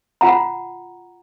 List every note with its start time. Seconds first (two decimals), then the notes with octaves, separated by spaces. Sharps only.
0.21 F4 F#5 A#5